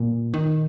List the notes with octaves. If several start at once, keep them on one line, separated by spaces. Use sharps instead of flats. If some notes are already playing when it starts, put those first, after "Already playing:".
Already playing: A#2
D#3